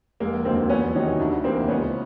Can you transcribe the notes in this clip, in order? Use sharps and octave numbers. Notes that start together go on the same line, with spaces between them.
F1 G#3 A#3
D#2 D3 F#3 A#3 C4
E2 B3 C#4
C3 D#3 F#3 C#4 D#4
D2 D4 E4
C3 E3 A#3 C4
C#2 B3 C#4